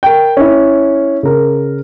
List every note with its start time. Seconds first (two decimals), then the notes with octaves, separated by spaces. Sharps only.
0.03 A#4 G5
0.37 C#4 E4
1.23 C#3 A#4